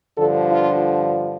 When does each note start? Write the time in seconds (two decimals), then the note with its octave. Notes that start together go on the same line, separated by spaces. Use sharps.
0.17 G2 D3 F3 A4
0.51 F4